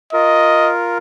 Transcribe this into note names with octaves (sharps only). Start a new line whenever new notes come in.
F4 A#4 D#5